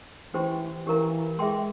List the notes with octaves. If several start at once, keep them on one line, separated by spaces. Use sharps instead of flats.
E3 C#4 G4 C5 G5 C6
E3 C#4 G4 A#4 F5 A#5
G#3 G#4 E5 G5 C6